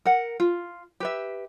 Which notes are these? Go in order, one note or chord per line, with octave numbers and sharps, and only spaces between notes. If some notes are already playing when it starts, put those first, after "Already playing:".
A#4 F#5
F4
G4 B4 E5